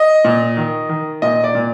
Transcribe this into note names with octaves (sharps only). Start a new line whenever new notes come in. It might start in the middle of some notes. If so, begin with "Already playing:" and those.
Already playing: D#5
A#2
D#3
D#3
A#2 D#5
D5
A#2